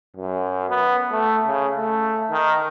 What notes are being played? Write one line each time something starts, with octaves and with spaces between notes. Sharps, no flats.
F#2
B3
A3
C#3
A3
D#3